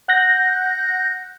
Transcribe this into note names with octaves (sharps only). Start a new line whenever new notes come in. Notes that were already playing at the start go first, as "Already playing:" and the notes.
F#5 F#6 G6 A#6